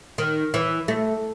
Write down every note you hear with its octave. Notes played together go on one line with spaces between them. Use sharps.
D#3
E3
A3